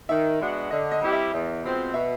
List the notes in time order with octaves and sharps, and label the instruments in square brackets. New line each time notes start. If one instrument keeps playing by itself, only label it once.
[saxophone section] D#3 [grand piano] E5
[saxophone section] G#3 B3 D4 F#4
[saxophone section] D3 [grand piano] D#5
[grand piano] D#5
[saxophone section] G3 C4 E4 G4
[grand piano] E5
[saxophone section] E2
B2 G#3 C4 F4
[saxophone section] B2 [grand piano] E5